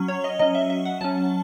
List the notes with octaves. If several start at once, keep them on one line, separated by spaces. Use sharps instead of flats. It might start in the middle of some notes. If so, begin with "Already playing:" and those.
Already playing: F#3 C#4
C#5
D#5
F#3 C#4 D#5
E5
E5
F#5
F#3 C#4 A5